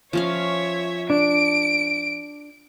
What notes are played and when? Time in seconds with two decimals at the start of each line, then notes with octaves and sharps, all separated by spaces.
0.13 F3 C#4 C#5 E5 F5
1.10 D4 D7